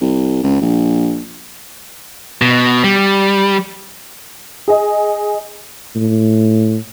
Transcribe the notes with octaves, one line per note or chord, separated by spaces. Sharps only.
C2
C#2
A#1
B2
G3
G#4 D#5
A2